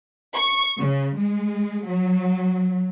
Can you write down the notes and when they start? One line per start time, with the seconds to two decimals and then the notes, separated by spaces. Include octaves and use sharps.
0.34 C#6
0.79 C#3
1.16 G#3
1.86 F#3